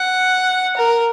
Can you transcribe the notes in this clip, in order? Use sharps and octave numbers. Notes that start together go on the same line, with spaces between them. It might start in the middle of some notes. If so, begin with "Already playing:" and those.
Already playing: F#5
A#4